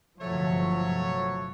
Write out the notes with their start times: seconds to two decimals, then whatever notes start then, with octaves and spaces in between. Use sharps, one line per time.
0.21 G1 C3 F3 F#3 A3 C#5